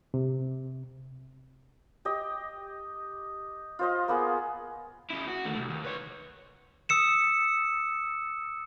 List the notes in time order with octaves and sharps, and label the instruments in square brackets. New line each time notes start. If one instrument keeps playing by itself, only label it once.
[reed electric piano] C3
[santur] G4 D#5
F4 C5 D#5
A#3 B3 G#4
[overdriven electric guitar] C#3 E4
F#4
D#2 A3
C2
D#2
B4 C#5
[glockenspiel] D#6 E6 C#7 E7